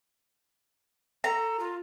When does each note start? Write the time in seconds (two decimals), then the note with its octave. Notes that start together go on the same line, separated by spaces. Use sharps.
1.24 A4 A#5
1.59 F4